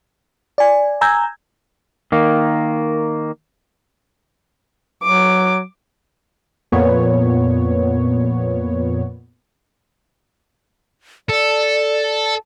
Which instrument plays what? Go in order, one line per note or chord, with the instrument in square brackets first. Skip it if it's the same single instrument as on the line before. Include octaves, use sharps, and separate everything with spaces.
[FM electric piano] D5 G#5
G#5 A#5 E6 G6 G#6
[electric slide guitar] D#3 A#3
[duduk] F#3 [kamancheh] D6
[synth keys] F2 A#2 B3 C#5
[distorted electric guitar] A4 [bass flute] D5